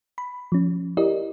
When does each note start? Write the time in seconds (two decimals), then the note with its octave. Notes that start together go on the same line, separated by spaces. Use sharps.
0.18 B5
0.52 F3 C#4
0.97 E4 G4 A#4 D5 D#5